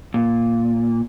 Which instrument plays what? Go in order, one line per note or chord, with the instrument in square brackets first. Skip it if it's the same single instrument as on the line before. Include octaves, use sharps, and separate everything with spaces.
[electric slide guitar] A#2